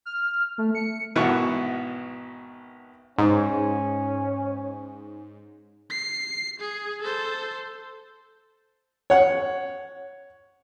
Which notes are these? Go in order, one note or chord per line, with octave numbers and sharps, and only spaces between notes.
F6
A3
C#7
G#1 B2 E3 B4 F#5 C#6
G#2 C#4
C7
G#4
A4 C5
C#5 F#5